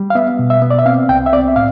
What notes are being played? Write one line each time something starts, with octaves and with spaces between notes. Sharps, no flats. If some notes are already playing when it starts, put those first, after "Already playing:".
Already playing: G3
F5
B3 E5
B2
E5
B3
D5
E5
C4 F5
C2 G5
E5
C4 D5
E5
A2 F5